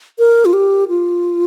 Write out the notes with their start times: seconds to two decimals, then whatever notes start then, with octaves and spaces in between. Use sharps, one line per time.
0.19 A#4
0.45 F4
0.53 G4
0.88 F4